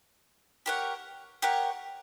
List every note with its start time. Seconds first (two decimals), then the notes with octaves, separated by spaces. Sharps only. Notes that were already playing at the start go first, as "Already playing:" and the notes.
0.66 G4 A#4 C#5 F#5
1.42 G4 A#4 C#5 F#5